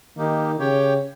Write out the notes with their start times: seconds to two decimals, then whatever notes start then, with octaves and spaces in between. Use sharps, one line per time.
0.17 D#3 A#3 D#4 G4
0.59 C#3 G4 C#5 G5